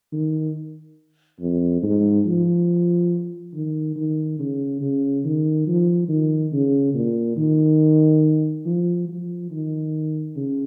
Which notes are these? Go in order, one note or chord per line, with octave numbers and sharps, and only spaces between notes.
D#3
F2
G#2
F3
D#3
D#3
C#3
C#3
D#3
F3
D#3
C#3
A#2
D#3
F3
F3
D#3
C#3